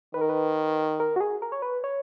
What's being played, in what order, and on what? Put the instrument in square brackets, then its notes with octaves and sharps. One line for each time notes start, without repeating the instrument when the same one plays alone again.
[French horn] D#3 [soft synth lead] B4
[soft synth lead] A#4
B4
A#4
F#4
G#4
A#4
C#5
B4
C#5